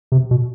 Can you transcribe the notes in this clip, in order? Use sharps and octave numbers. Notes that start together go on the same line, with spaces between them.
C3
B2